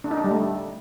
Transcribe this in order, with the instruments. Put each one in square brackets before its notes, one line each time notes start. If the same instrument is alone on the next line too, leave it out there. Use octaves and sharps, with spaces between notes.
[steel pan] D4
D#4
D4
G3
A3